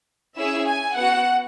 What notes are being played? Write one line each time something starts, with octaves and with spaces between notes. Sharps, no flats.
C#4 E4 G#4 E5
G#5
B3 F#4 F#5